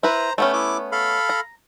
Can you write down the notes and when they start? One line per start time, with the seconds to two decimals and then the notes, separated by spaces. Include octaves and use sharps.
0.03 E4 B4 C5 A#5
0.38 A3 B3 C#4 F#5 G5
0.53 E4 D6
0.92 A4 F5 B5
1.29 A#5